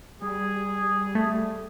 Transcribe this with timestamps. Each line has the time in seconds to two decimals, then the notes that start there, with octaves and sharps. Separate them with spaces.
0.22 G3 G#4
1.15 A3